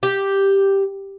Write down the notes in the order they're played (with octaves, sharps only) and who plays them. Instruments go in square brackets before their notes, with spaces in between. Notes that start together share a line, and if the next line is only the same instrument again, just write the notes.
[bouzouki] G4